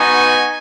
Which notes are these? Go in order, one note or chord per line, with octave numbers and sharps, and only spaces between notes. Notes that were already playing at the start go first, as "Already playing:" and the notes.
Already playing: B3 D#4 F#4 G#5